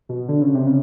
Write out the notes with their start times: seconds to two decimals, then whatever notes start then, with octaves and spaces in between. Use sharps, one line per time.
0.09 B2
0.29 D3
0.41 C#3
0.54 C3
0.67 C#3